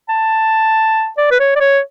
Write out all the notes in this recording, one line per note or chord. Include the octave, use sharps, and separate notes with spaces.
A5
D5
B4
C#5
D5
C#5